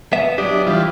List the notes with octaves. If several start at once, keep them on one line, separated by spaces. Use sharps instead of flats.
B3 E5
F#3 D4 G4 D#5
E3 G3 F4